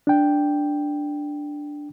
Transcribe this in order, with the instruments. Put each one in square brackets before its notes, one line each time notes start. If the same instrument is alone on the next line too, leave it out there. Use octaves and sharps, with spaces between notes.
[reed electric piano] D4 G5